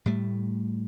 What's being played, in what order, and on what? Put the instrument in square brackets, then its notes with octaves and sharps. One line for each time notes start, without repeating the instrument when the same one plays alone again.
[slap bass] A2 G3 A3